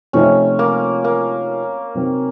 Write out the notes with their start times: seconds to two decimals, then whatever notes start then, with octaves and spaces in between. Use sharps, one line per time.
0.13 C3 F3 A3 C4 C#4 D#4
0.59 A#3
1.04 A#3
1.95 C3 F#3 C4 D#4